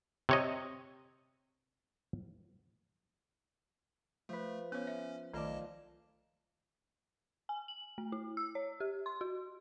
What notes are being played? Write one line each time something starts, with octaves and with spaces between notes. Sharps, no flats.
C3 C#5 D#5
F3 A3 B4
B3 C#4 C#5
E5
B1 D#3 A3 F4 D5 D#5 A5
G#5
F#7
A3
E4
E6
C#5
G4
C6
F#4